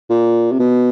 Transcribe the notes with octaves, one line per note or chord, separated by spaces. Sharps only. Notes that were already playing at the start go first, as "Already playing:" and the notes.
A#2
C3
B2